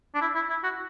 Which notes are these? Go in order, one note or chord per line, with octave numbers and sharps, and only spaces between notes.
D4
E4
E4
E4
F#4